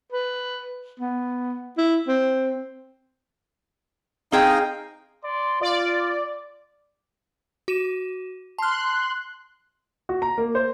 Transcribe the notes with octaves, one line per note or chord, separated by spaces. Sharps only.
B4
B3
E4
C4
C4 D#4 G#4 D#5 F5 G5
D5 C6
F4 D5
F#4 D#7 E7
A5 C6 F6 F#6
F#4
A#5
A#3
C5